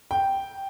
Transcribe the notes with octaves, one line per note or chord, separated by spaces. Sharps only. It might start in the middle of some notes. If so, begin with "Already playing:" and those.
G5